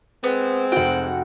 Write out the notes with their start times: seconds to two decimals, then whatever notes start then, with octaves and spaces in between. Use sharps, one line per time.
0.24 G#3 B3 C4
0.72 F1 F#4 F#5 G5